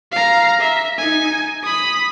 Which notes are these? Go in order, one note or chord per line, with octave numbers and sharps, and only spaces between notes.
F5 A#5
E5
D#4 G#5
B5 D#6